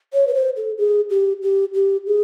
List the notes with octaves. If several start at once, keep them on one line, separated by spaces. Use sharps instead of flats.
C#5
B4
C5
A4
G#4
G4
G4
G4
G#4